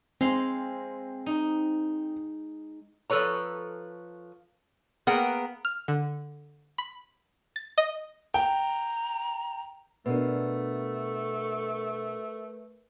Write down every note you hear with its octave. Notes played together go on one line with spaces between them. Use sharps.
G#3 C4 F5 C6
D#4
F3 A4 B4 C#5 A#5
A#3 B3 G#4 A#4 F#5 G5
F6
D3
B5
A6
D#5
G5 A#5
B2 A3 D4 A#4 B4